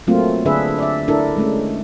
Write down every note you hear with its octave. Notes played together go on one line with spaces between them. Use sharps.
F#3 A3 A#3 C4 F4
D3 D4 G#4 B4 E5
D5 E5
D4 E4 A4 A#4
G#3 A3 C#4